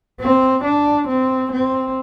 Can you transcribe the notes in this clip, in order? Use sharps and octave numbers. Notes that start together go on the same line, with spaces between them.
C4
D4
C4
C4